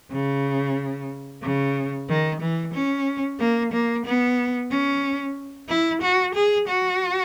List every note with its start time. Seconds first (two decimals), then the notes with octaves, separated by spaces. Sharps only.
0.11 C#3
1.42 C#3
2.09 D#3
2.41 E3
2.74 C#4
3.39 A#3
3.72 A#3
4.05 B3
4.70 C#4
5.68 E4
6.02 F#4
6.35 G#4
6.67 F#4